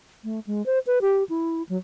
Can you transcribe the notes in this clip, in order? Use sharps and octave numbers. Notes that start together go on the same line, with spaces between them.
A3
G#3
C5
B4
G4
E4
F#3